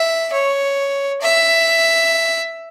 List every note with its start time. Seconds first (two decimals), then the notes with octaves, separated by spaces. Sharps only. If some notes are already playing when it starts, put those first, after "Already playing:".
Already playing: E5
0.33 C#5
1.21 E5